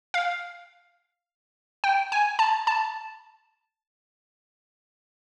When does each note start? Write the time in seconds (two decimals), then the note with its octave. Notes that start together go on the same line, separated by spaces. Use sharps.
0.14 F5
1.84 G5
2.12 G#5
2.39 A5
2.67 A5